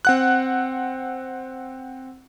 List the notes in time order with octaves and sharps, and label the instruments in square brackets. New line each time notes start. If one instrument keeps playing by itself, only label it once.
[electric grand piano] C4 F#5 F#6